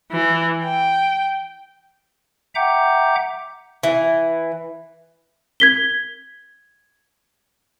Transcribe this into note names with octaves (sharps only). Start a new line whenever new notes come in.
E3
G5
E5 F#5 G5 A#5 D6 G6
E3
G#6 B6 G7